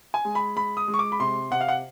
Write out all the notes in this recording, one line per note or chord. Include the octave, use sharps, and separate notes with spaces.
G#5
G#3
B5
G#3 B5
D#6
G#3
C#6
D6
B5
C3 C6
C3 F#5
F5
F#5